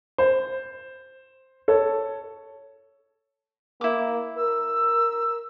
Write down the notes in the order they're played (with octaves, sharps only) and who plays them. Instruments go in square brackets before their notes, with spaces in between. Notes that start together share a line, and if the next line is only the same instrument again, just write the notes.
[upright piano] C5
A4 C#5
[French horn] A#3 [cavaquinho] E4 D6
[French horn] A#4 [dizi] E6